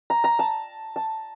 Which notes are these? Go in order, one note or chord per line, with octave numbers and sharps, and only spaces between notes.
A#5
A#5
A5
A5